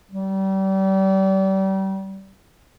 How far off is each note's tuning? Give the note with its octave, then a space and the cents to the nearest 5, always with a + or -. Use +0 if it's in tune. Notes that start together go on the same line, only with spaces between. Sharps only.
G3 -35